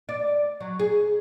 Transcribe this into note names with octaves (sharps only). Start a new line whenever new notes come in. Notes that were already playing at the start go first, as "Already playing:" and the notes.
D5
F#3
G#4